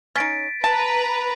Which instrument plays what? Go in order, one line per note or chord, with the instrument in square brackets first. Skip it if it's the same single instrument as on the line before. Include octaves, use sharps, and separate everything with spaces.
[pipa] C#4 D#4 [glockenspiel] A6 B6 D7
[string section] B4 A#5 [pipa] A5